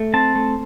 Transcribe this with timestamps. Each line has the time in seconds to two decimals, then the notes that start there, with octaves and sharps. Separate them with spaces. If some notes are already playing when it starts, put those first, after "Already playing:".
Already playing: A3
0.14 C4 A5
0.36 A3